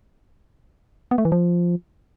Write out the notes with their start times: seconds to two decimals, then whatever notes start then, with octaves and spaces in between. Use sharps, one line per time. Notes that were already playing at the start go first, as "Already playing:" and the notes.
1.11 B3
1.18 A3
1.25 E3
1.32 F3